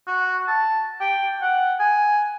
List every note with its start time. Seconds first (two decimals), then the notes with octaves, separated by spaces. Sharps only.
0.07 F#4
0.47 A5
1.00 G5
1.42 F#5
1.80 G#5